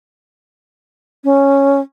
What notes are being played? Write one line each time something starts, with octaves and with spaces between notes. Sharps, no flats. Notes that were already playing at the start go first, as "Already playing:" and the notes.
C#4